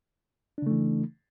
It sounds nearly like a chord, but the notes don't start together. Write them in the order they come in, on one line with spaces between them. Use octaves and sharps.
D4 C#3 A3 E3